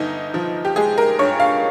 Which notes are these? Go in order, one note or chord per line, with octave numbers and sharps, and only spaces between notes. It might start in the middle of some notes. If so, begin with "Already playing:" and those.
Already playing: G1 D#4
F3
G4
G#3 G#4
A#4
G2 C#5
F5